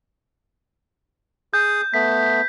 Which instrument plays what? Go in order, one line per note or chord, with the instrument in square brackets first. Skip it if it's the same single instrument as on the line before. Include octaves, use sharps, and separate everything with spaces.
[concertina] G#4 D#6 [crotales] G6
[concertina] A3 B3 [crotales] B6